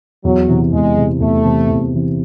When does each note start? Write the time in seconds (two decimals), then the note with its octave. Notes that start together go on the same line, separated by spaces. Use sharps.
0.24 E2 F#3
0.48 C3 E3
0.72 E2 G#3
0.97 C3 E3
1.20 E2 A3
1.45 C3 E3
1.69 E2
1.94 C3 E3